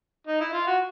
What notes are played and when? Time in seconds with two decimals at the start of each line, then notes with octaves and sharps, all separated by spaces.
0.27 D#4
0.41 E4
0.53 F4
0.67 F#4